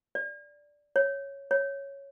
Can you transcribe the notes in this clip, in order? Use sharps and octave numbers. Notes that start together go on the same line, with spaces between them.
D5
C#5
C#5